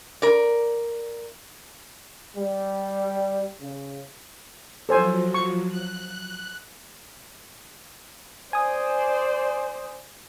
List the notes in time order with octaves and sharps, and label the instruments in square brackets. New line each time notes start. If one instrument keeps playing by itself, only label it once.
[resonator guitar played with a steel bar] A#4 D5
[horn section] G3
C#3
[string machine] F3 F#3 [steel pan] A4 C5 G#5
[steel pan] C#6
[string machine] F#6
[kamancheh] C5 D5 [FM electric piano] G#5 D#6